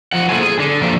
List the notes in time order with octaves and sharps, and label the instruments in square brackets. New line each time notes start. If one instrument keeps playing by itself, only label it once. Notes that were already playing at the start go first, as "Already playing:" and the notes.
[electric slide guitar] F3 F#5
A#3 E4 A4 C5 G#5
G#4
D3
D3 F3 G3 A3 A#3 D4